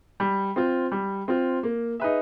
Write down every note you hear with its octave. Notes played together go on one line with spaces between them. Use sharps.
G3
C4 F4
G3
C4 F4
A#3
D#4 G#4 B4 E5